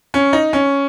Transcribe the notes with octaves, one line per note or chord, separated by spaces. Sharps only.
C#4
D#4
C#4